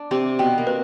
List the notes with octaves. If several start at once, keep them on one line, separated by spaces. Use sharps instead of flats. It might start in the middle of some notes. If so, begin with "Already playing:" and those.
Already playing: D4
C3 C4 G4
B2 B3 G5
A#3
C4 B4